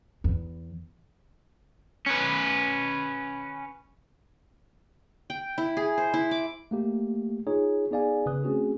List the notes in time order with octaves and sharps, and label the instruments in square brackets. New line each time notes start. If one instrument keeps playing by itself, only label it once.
[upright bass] E2
[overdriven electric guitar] C#4 B4
[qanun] G5
E4
G#4
C5
E4
D6
[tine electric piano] A3 A#3 G4
D#4 F4 G#4 C#5
B3 D#4 G#4 D5 F5 G#5
G1 C#3 B4 D#6 F#6
A3 C4 C#4 F#4 G#4